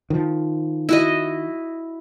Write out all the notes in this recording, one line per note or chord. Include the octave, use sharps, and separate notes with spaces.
D#3 F3
E4 F#4 D#5